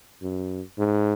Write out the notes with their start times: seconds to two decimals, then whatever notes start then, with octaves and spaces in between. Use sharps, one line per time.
0.22 F#2
0.78 G#2